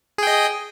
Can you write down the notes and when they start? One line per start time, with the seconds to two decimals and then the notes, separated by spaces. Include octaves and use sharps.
0.18 G#4
0.23 G5
0.27 D#5